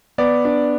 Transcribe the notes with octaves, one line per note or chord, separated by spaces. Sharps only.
B3 D5
D4